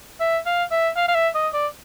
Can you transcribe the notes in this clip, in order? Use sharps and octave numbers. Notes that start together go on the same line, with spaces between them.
E5
F5
E5
F5
F5
E5
D#5
D5